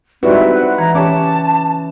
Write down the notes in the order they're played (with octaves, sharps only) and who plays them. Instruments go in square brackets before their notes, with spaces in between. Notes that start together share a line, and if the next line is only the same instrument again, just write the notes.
[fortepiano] G#2 G3 F#4 [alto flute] C4 [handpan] E4 B4 [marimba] D5 E5
[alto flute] F#5
[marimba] E3 [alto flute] A#5
[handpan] C#4 [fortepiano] G4 C#5 D6 [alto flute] A5